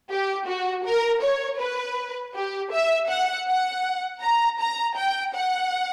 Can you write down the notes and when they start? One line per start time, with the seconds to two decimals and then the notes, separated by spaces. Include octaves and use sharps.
0.10 G4
0.48 F#4
0.85 A#4
1.23 C#5
1.60 B4
2.35 G4
2.72 E5
3.10 F#5
3.48 F#5
4.22 A#5
4.60 A#5
4.97 G5
5.34 F#5